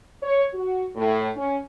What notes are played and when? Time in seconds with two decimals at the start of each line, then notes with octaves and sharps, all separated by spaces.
0.23 C#5
0.54 F#4
0.96 A2
1.37 C#4